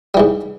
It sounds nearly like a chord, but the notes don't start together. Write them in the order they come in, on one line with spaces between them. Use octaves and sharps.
G3 E3 G#2